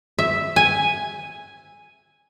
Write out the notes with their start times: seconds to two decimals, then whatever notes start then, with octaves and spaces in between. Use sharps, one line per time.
0.19 E5
0.56 G#5